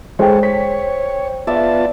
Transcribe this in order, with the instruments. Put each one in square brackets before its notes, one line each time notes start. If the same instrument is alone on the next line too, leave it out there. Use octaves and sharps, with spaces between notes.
[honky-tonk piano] G#3 [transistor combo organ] G#4 A4 C#5 [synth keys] C5 G5
[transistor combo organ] C#5 [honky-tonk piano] B6
[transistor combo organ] B3 F4 A5 [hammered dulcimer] D5 E5